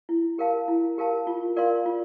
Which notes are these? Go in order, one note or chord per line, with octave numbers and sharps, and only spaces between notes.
E4
G4 A#4 F5 A5
E4
G4 A#4 F5 A5
F4
A#4 D5 F5 C6
F4